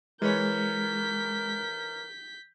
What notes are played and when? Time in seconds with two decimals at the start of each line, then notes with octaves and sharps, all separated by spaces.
0.22 E3 G#3 A#4 B4 C#5 G6 B6